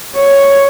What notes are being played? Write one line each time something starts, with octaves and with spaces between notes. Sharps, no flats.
C#5